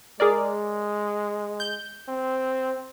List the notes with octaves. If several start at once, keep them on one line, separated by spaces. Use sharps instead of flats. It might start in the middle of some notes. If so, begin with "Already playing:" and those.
G#3 G#4 A#4 D5
G6
C4